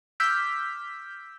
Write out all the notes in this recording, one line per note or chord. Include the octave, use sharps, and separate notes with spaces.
D6 E6 F6 G6 B6